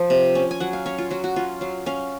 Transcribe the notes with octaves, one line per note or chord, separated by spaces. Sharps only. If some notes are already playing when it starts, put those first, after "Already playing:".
Already playing: F3
C3
C#4
G#5
F#3 F#5
F5
C#4 C#5
F4
F#3 F#4
F#4
C#4 F4
F#3 F5
C#4 F5